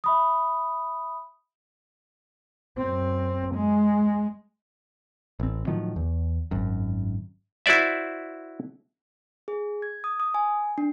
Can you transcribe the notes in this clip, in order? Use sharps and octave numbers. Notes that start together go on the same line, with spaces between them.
E5 B5 D#6
F#2 C4
G#3
A1 C4
A2 D#3 F3 F#3
E2
G#1 F#2
E4 F#4 C5 D5 E5
G#4
G#6
D#6
D#6
G#5
D4